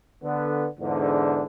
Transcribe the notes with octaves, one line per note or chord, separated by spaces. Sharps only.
D3 B3
E2 G#2 D3